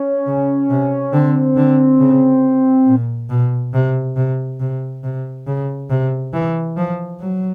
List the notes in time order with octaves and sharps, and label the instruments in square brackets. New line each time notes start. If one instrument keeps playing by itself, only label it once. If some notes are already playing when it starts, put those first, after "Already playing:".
Already playing: [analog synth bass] C#4
[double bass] C#3
C3
[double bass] D3 [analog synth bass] C4
[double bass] D3
C#3
A#2
B2
C3
C3
C3
C3
C#3
C3
E3
F3
F#3